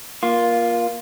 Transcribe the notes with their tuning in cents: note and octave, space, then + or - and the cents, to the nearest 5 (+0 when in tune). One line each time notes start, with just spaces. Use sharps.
A#3 +20 F4 +0